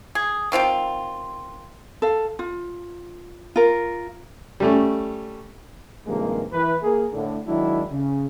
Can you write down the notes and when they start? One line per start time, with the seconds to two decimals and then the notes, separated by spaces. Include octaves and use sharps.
0.15 G#4
0.52 D#3 C4 F4 G5
2.02 A4 F5
2.39 F4
3.56 F4 A#4
4.60 G3 A3 C#4
6.06 G2 C3 D#3 F3 G#3 A#3
6.53 E3 B4
6.83 A#3 G#4
7.12 A2 D3
7.47 D#3 F#3 G#3 D4 E4
7.91 C#3